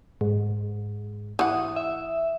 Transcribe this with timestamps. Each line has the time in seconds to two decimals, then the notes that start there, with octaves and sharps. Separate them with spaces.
0.21 G#2
1.39 E3 F#5 D#6
1.76 E5